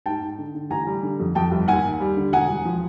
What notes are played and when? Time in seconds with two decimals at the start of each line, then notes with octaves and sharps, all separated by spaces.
0.06 G#2 G5 A5
0.22 G#2
0.38 D3
0.55 D3
0.70 A1 G#5 A#5
0.87 G3
1.03 D3
1.20 F2
1.35 F2 G5 A5
1.51 G1
1.68 D#2 F#5 G#5
1.84 D#2
2.00 G3
2.17 D3
2.32 E1 F#5 G#5
2.49 E1
2.65 F3